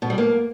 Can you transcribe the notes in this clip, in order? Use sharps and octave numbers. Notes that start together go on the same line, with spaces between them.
B2
G3
A#3